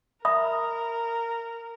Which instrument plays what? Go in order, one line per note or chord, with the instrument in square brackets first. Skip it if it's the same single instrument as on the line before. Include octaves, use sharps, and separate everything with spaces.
[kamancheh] A#4 [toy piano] E5 B5 D#6